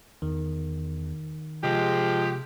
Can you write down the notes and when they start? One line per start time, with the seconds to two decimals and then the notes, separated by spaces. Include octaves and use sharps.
0.22 E2 D#3
1.63 C3 F3 G#3 G4